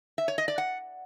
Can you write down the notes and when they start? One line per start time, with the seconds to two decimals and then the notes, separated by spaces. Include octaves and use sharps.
0.18 E5
0.28 C#5
0.38 D#5
0.48 D5
0.58 F#5